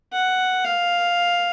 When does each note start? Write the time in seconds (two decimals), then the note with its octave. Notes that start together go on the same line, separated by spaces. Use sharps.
0.13 F#5
0.64 F5